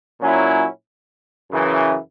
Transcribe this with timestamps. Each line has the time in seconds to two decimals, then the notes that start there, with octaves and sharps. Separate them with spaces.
0.20 A#2 F#3 C#4 E4
1.51 F#2 C#3 E3